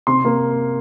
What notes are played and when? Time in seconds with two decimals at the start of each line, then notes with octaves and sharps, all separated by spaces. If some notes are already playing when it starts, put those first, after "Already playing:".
0.07 C3 C6
0.25 A#3